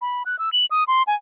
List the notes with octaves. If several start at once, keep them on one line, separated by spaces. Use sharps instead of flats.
B5
F#6
E6
F#7
D#6
C6
G#5